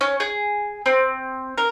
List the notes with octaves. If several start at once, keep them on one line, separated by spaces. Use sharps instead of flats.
C#4
G#4
C4
A#4